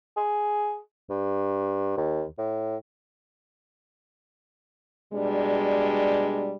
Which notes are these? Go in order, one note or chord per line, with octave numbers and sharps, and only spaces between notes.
G#4
G2
D#2
A2
B2 G3 G#3 D4